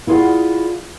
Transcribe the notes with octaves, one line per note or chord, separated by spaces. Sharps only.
E4 F4 G#4 C#5 D5 F#5